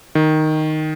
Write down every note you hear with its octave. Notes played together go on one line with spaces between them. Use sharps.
D#3